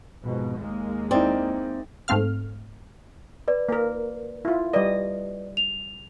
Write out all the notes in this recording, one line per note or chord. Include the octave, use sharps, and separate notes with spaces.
F2 G#2 B2
D#2 G#3 A#3
C4 D#4 E4 D5
G#2 A3 C4 F5 F6
B4 D5
A#3 A#4
E4 F4
G3 B4 D5 D#5
F7